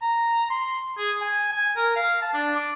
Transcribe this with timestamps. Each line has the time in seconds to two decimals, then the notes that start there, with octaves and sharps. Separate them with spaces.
0.02 A#5
0.50 C6
0.98 G#4
1.21 G#5
1.52 G#5
1.77 A#4
1.96 F5
2.22 A5
2.34 D4
2.56 D6